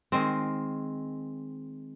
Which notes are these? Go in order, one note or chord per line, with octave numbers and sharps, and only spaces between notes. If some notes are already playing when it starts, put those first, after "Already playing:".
D#3 G#3 C4